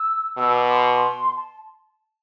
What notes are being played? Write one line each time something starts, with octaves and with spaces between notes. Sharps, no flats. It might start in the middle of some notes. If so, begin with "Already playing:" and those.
Already playing: E6
B2 E6
D6
C6
D6
C6
A5